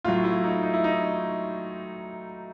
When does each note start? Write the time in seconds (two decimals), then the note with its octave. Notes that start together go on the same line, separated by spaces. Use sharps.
0.05 A2 F#3 F4
0.24 E4
0.44 D#4
0.63 D#4
0.74 E4
0.84 D#4